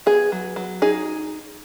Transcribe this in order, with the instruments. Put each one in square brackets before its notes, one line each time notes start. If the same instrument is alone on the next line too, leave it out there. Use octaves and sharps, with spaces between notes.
[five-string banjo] B3 G#4
F#3
F#3
D#4 G#4